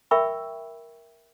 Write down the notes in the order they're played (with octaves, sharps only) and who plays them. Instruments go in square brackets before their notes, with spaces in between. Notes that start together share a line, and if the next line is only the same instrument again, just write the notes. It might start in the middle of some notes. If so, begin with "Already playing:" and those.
[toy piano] A#4 E5 G5 B5 C#6 E6